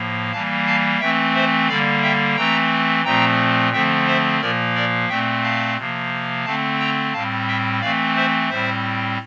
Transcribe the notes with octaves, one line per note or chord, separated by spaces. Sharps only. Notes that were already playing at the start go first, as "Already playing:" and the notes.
Already playing: A2 F3 A#3
E3 G3 A#3 F5 A5
F5 A5
E3 A3 C4 E5 G5
C5 E5
D3 G3 A#3 D5 F5
E5 G5
E3 A3 C4 G5 A#5
A#2 F3 A3 C4 G5 A#5
D3 F3 A3 C4 E5 G5
C5 E5
A#2 F3 A#3 A#4 D5
A#4 D5
A#2 A3 C4 E5 G5
F5 A5
C3 F3 A#3
D3 A3 C4 F5 A5
G5 A#5
A2 G3 C4 F5 A5
E5 G5
E3 A3 C4 D5 F5
C5 E5
A2 G3 C4 C5 E5